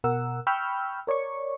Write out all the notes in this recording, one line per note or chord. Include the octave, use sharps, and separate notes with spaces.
B2 A#4 F#5 E6
G5 B5 C#6 E6 F6 G6
A#4 C#5 D5 C#6